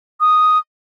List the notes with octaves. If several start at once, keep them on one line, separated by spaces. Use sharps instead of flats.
D#6